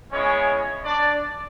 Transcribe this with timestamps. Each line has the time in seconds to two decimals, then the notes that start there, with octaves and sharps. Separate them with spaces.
0.11 G#3 B3 C#4 E4 C#5
0.84 D4 D5